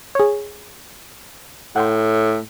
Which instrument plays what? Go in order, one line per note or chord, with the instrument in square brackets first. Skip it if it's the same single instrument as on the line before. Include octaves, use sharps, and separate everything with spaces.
[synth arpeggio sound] G#4 C#5
[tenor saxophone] A2 [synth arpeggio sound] F#5 G5 C6